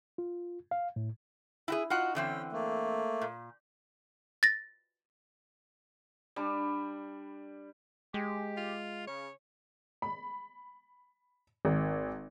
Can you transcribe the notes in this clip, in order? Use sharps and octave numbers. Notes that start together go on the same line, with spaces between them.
F4
F5
A2
E4 F#4 G#4
D#4 F4 F#4 F#5
D3 E3 C4 C#4 G5
A3 A#3
A#2
A6 A#6
G3 D4
G#3 G4
F4
C#3 C#5
B5
G#1